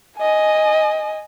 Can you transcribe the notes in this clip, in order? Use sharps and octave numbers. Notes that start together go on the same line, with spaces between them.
D#5 G#5